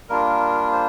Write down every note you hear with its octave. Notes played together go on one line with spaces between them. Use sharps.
G3 A#3 D4 F4 A#4
A#4
C5